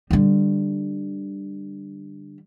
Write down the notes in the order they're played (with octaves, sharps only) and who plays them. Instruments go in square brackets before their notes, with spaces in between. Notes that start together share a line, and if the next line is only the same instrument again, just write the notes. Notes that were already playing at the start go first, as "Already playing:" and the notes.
[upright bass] D3 G3